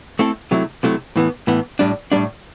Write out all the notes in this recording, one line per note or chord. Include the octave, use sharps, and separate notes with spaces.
A3 C4 E4 A4
C3 F#3 A3 E4
C3 F#3 A3 E4
A2 E3 B3
A2 E3 B3
A2 G3 D4
A2 G3 D4